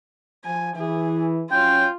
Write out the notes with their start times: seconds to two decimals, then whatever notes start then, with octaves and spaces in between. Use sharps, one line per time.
0.45 F3 G#5
0.76 E3 G#4
1.51 F#3 C#4 F4 G5